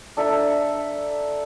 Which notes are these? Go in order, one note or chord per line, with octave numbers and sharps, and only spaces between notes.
D4 A4 E5 A#5